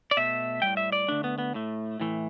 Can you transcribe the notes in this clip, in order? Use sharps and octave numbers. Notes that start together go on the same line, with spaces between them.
D5
B2 A3 E5
A2 G3 G5
E5
D5
D3 A3 D4
B3
B3
A2 A3
A2 E3 A3